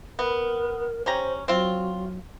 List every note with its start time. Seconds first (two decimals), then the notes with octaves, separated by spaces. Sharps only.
0.19 B3 A#4
1.06 C#4 G4 C5 A#5
1.48 F#3 C4 F4